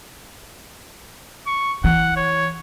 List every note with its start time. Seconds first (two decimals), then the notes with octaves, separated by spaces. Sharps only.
1.47 C#6
1.84 E3 F#5
2.16 C#5